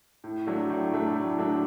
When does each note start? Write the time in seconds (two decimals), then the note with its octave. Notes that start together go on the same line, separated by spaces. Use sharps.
0.24 A2
0.47 F#3 A3 D4
0.70 A2
0.92 F#3 A3 D4
1.15 A2
1.38 F#3 A3 D4